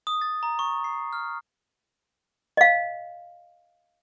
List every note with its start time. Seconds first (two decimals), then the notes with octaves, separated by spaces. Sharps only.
0.07 D#6
0.21 A6
0.43 A#5
0.59 C#6
0.84 C7
1.13 F6
2.57 D#5 F5